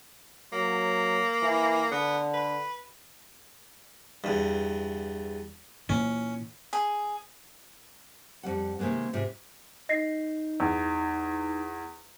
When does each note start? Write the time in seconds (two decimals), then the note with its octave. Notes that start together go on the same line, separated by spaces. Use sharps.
0.53 F#3 A#3
1.42 E3
1.92 D3 B3
2.34 B4
4.24 E2 G2
5.89 A#2 E3 C#4
6.73 G#4
8.43 F2 G3 F#5
8.79 C3 D#3 G#3 A#3 B3
9.13 G#2 C3 F4
9.89 D#4 D#5 A#6 C7
10.60 E2